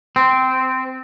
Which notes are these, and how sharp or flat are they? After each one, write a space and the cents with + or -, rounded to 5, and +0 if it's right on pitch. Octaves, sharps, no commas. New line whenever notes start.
C4 -10